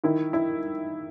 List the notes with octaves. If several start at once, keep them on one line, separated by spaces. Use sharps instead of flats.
D#3 E4
E4